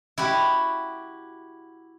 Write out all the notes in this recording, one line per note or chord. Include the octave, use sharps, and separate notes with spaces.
E4 F#4 G4